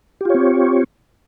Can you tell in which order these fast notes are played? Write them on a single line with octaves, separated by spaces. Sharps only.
G4 F4 C#5 C4